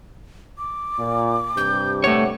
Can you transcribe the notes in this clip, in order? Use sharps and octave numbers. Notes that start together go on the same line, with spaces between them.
D6
A#2
G2 C3 G6
A3 C#5 F#5